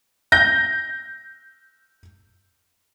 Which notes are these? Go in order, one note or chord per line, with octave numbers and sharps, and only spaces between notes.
G6 A#6